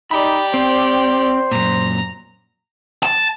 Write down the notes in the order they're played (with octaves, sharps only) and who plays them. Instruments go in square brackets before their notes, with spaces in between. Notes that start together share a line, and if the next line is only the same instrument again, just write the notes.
[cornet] D#4 [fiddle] G4 D5 [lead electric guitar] B5
[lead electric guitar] C4 [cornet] C5
[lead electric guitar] F#2 A#2 [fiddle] A#5
[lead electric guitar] A5